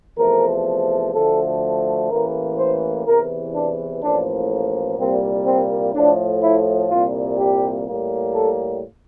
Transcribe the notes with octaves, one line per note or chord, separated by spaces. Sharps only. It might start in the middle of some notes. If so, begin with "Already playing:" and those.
E2 C3 F3 A3 A#4
D2 D3 F3 A3 A4
A1 A2 E3 A#3 A#4
C5
E2 C3 E3 A#4
D4
A1 A2 F3 A#3 D4
C2 A#2 G3 A#3 C4
C4
A2 F3 A3 D4
E4
C2 A#2 G3 A#3 F4
G4
A2 G3 A#3
A4